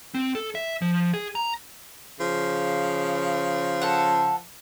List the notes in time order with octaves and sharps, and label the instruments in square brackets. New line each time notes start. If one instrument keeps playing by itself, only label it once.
[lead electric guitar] C4
A4
E5
F3
G#4
A#5
[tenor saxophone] C#3 [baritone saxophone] F3
[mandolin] A4 F#5